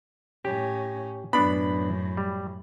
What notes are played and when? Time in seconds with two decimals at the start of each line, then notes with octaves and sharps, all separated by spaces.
0.45 A2 C#4 G4
1.33 F#2 A2 B3 D4 B5
2.17 G3